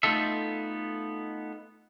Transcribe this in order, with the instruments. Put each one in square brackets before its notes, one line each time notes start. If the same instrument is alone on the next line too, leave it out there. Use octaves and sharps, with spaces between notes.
[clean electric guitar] A3 B3 D#4 F4 A4 E5